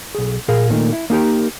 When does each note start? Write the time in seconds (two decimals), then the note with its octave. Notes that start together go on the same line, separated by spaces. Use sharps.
0.15 B1 G#4
0.48 A#2 G#4 A#4 F5
0.70 A#2 D#3 A3 A#3
0.93 E4
1.10 A#3 D#4 G4 A#4